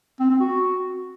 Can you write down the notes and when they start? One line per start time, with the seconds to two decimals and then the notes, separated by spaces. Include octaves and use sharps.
0.20 C4
0.30 C4
0.40 F#4